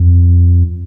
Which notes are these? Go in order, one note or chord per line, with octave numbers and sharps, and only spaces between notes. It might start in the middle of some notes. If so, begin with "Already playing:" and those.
Already playing: F2